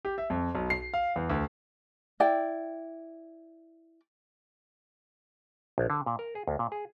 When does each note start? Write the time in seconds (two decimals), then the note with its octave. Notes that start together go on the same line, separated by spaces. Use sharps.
0.05 G4
0.18 E5
0.30 F2
0.55 B1
0.70 C7
0.94 F5
1.16 E2
1.30 D2
2.20 E4 D5 G5
5.78 A#1
5.90 D3
6.06 A#2
6.19 A#4
6.35 G#4
6.47 D2
6.59 A#2
6.72 G#4